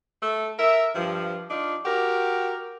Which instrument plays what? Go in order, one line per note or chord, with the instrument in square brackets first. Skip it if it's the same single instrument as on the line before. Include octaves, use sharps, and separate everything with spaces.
[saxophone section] A3 A4
A#4 E5
G2 F3
D4 D#4 F4
F#4 G4 A#4